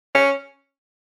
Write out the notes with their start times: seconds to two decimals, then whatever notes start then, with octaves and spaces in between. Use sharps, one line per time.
0.15 C#4